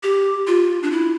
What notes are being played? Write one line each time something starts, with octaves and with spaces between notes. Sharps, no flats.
G4
F4
D4
E4